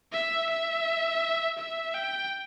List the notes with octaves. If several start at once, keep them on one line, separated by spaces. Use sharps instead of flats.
E5
E5
E5
G5